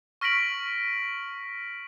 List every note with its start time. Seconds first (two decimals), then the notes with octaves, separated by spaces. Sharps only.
0.21 C#6 F6 A#6 B6 D7 F#7